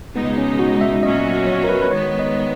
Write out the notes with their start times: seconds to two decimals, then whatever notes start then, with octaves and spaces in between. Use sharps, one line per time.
0.16 C#2 B2 G#3 B3 D#4
0.38 C#4
0.59 F#4
0.81 E5
1.03 A#2 F#3 C#4 F#4 D#5
1.47 C#5
1.64 A#4
1.69 B4
1.82 B4
1.90 D#3 G#3 B3 C#5
2.19 D#5